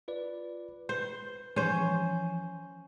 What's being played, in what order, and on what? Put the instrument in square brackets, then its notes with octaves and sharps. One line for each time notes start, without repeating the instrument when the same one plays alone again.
[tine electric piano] F4 B4 D5
[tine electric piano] B4 [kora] C5
[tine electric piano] E3 F3 [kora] C#4 C5